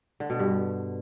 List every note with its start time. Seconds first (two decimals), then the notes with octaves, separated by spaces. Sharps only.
0.20 D3
0.30 B2
0.39 G2